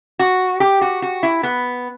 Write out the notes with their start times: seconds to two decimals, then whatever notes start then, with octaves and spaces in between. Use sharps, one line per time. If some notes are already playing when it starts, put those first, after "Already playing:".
0.19 F#4
0.60 G4
0.81 F#4
1.02 F#4
1.23 E4
1.43 B3